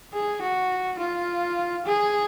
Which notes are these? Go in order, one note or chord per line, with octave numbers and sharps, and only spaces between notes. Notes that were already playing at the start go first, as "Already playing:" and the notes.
G#4
F#4
F4
G#4